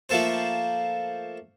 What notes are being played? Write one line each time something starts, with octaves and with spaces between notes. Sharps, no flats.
F3 A3 A#3 A4 C5